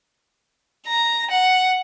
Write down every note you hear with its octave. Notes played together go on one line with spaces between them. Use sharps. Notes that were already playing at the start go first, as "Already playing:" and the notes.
A#5
F#5